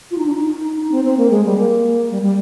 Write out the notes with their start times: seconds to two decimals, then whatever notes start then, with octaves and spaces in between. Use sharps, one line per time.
0.11 F4
0.18 D#4
0.26 D4
0.34 D#4
0.91 C4
1.04 C4
1.17 A#3
1.30 G#3
1.45 G3
1.58 A#3
2.11 G3
2.22 G3